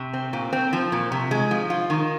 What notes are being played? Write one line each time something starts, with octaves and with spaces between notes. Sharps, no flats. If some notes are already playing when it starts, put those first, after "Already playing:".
Already playing: C3
C4
A#2
C4
F3
A#2
C3
G#3
F3
F4
D#3